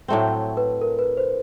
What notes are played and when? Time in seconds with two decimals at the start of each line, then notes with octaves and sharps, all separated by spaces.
0.08 A2 F#3 A3 C4
0.57 B4
0.82 A#4
0.99 B4
1.17 C5